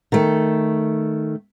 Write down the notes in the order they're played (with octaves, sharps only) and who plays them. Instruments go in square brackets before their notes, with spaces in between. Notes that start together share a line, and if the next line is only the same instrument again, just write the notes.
[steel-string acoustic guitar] D#3 A3